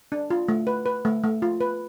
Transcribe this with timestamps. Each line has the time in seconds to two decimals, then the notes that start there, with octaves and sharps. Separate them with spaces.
0.12 D4
0.30 F4
0.49 A3
0.67 B4
0.86 B4
1.05 A3
1.24 A3
1.42 F4
1.61 B4